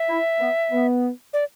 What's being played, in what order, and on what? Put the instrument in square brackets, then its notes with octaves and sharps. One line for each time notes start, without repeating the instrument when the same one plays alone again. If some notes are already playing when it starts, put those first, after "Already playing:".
Already playing: [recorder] E5
[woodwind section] E4
B3
B3
[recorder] D5